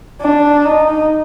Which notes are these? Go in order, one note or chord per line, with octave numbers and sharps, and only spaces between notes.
D4
D#4